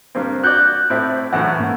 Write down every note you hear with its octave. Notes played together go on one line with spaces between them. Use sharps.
G2 A#3 C4
F#4 D5 F#6 G6
A2 C4 E4
F#2 A2 E3 F#5
G#2 A#3